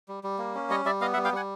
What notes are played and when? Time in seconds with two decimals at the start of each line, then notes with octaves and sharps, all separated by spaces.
0.08 G3
0.24 G3
0.39 A#3
0.55 C#4
0.70 G3 C#5 D#5
0.85 G3 D5 E5
1.01 B3 D#5 F5
1.13 E5 F#5
1.17 G3
1.25 F5 G5
1.32 G3 F#5 G#5